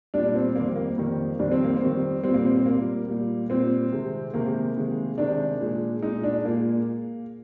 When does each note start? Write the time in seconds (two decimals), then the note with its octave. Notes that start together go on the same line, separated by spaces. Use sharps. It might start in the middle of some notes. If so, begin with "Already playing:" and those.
0.14 A#2 G3 D4
0.35 C4
0.56 F2 D#3 G3 A#3
0.76 A#3
0.98 F2 D#3 G3
1.39 F2 D#3 G3 D4
1.52 C4
1.64 A#3
1.76 C4
1.81 F2 D#3 G3
2.24 A#2 G3 C4
2.34 A#3
2.45 C4
2.56 C4
2.66 A#2 G3 A#3
3.09 A#2 G3
3.50 A#2 G3 C4
3.92 C3 D#3 G#3
4.34 C3 D#3 G#3 A#3
4.76 C3 D#3 G#3
5.18 C3 D#3 G#3 D4
5.61 A#2 G#3
6.02 A#2 G#3 D#4
6.24 D4
6.45 A#2 G#3 A#3